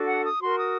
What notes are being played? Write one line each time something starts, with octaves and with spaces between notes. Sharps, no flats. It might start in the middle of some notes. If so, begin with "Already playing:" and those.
Already playing: D4 F#4 A4
F#5
D#6
F#4 A#4 C6
D#6